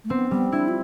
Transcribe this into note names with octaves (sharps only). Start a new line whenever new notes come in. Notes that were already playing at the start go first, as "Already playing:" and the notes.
A3
B3 C4
G3 B3
D4 E4
F4